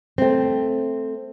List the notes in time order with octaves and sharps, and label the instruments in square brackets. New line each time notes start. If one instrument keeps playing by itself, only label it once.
[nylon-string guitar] A3 C4